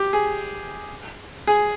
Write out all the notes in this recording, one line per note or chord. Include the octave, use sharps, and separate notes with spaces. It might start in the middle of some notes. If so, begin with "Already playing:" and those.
Already playing: G4
G#4
G#4